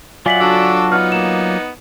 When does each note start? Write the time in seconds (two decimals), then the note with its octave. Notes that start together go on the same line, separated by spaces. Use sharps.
0.26 F#3 F4 D5 E5 F#5 G#5 B6 F#7
0.40 D4 F#4 A4 D6 E6
0.92 B3 D#4 F6
1.12 A#3 E7